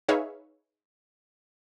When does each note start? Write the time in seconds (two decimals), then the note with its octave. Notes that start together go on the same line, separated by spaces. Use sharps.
0.09 D#4 G#4 B4 C#5 E5 F5